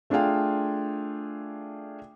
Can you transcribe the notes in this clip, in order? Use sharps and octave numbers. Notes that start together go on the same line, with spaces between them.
A3 D4 F4 G#4 F5 G5